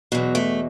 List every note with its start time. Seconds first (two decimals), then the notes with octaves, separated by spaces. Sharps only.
0.12 E2 B2 F#3
0.35 A3